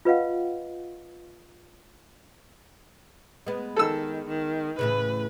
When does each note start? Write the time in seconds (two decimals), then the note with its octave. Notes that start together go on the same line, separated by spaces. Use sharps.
0.05 F4 B4 D#5 F5 F#5
3.47 G#3 B3
3.76 D#3 A4 E6
4.28 D#3
4.79 E2 A2 C#3 B4